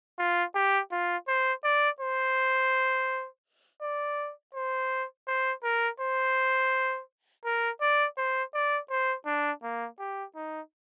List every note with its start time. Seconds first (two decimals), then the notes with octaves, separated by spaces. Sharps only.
0.19 F4
0.55 G4
0.92 F4
1.28 C5
1.64 D5
2.01 C5
3.82 D5
4.55 C5
5.28 C5
5.64 A#4
6.00 C5
7.45 A#4
7.81 D5
8.18 C5
8.54 D5
8.90 C5
9.26 D4
9.63 A#3
9.99 G4
10.36 D#4